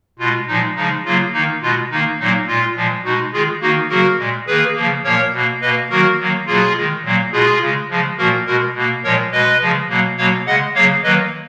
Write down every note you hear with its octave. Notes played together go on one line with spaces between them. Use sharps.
B2 G#3 F4
A#2 F3 G#3 D#4
C#3 F3 G#3 D#4
C#3 F#3 A#3 F4
D#3 A#3 D#4
B2 G#3 F4
D#3 A#3 D#4
A#2 F#3 A#3 D#4
A#2 G#3 F4
A#2 F3 G#3
B2 D#4 F#4
G#3
D#3 G#3 F4 G#4
D#3 A#3 D#4 F#4
C#3 F#3 A#3 F#4 A#4
A#2 G#3
D#3 A#3 G#4 B4
C#3 F3 A#3
A#2 F3 A#3 A#4 C#5
B2 A#3
B2 A#3 B4 D#5
D#3 F#3 A#3 F#4 A#4
D#3 F#3 A#3
B2 F#3 A#3 F4 G#4
D#3 G#3
A#2 F#3 A#3
B2 G#3 F4 G#4
C#3 G#3
C#3 F3 G#3
A#2 F3 A#3 F#4 A#4
B2 G#3 F#4 A#4
B2 A#3
A#2 F3 G#3 A#4 C#5
B2 G#3 B4 D#5
C#3 F3 G#3
B2 F#3 A#3
B2 F#3 A#3 C#5 F5
C#3 G#3 D#5 F#5
C#3 F#3 A#3 C#5 F5
D#3 F#3 A#3 B4 D#5